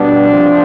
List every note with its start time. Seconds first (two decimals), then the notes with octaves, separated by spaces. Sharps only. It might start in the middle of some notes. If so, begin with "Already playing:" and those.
Already playing: B2 G3 B3 D4
0.29 C3 F3 C4